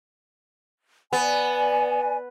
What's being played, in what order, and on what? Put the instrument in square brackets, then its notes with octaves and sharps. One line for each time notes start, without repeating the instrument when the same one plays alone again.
[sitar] B3 [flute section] D5 G#5